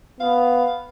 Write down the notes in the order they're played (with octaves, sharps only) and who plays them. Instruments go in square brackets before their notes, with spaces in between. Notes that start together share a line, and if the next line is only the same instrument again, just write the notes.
[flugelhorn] B3 [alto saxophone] F5